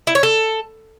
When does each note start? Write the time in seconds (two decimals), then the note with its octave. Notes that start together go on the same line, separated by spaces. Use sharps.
0.07 E4
0.15 C#5
0.23 A4